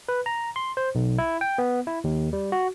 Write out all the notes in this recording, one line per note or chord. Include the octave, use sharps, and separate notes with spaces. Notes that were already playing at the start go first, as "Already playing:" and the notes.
B4
A#5
C6
C5
B1
E4
G5
B3
E4
D#2
G3
F#4